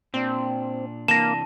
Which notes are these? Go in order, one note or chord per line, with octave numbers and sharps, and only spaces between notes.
A#2 C4 D4 D5
C3 E3 A#3 D4 A5 A#6 E7